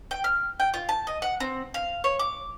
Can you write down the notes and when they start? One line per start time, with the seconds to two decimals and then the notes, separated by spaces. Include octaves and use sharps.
0.11 G5
0.24 F6
0.60 G5
0.74 F4
0.89 A5
1.07 D#5
1.22 F#5
1.40 C4
1.74 F5
2.04 C#5
2.19 D6